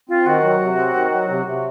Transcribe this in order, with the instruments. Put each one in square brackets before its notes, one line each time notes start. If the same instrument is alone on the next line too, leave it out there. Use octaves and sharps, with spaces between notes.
[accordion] C4 [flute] F4
[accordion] D#3 [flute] F#4
[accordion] F#3
C3
C4
D#3
F#3
C3
C3